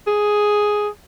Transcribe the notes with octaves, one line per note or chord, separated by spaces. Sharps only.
G#4